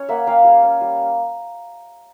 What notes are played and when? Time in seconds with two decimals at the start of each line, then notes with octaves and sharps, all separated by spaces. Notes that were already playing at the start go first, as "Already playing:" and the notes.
Already playing: C#4 C#5
0.09 A#3 E5 F#5
0.27 A#3 F5 G5
0.44 G3
0.63 C#4
0.81 G3